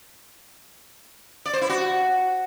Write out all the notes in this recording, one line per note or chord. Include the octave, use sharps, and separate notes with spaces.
D5
C5
E4
F#4